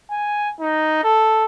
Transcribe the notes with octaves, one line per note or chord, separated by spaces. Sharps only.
G#5
D#4
A4